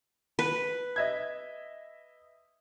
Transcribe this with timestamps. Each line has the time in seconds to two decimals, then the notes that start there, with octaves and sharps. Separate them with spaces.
0.39 B4
0.96 D#5 E5 G#6